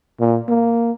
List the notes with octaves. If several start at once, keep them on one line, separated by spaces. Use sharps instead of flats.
A#2
A#3